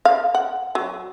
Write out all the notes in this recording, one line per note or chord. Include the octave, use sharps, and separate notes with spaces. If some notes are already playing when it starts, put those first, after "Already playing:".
F5
F#5
F#3